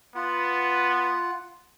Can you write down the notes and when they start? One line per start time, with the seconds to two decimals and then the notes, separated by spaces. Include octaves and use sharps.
0.15 B3 F4 F#5